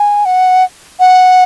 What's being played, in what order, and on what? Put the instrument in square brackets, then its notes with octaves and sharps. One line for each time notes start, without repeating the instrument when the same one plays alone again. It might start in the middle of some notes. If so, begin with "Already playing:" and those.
Already playing: [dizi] G#5
F#5
F#5